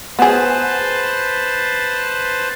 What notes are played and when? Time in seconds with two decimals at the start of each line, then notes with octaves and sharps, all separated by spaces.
0.19 B3 G#4 B4 C5 A5